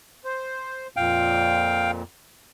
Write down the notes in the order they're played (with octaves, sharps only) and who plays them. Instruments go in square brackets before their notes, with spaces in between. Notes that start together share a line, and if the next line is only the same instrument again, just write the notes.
[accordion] C5
[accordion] F2 A#2 [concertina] F5 G5